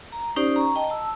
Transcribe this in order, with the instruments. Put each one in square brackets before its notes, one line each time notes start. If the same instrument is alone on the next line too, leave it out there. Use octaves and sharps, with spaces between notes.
[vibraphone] A#5
C#4 D#4 G4 C5 D5
A#5 C#6
D#5 G5 A5 A#5
A5 E6